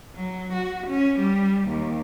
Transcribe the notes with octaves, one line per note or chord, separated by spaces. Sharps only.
F#3
F#4
C#4
G3
D#2